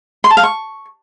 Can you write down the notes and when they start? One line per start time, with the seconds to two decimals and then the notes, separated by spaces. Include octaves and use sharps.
0.24 C6
0.30 A5
0.37 F5
0.43 C#6